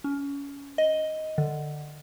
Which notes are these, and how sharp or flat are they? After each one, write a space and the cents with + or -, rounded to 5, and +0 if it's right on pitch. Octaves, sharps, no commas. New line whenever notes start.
C#4 +25
D#5 +10
D3 +20